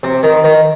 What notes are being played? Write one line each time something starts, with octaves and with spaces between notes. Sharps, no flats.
C3
D#3
D#3